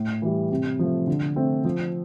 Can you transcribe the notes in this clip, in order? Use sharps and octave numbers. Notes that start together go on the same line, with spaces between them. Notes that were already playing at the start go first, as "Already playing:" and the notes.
Already playing: A2
E3 G3
C3
F3 A3
D3
A3 C4
F3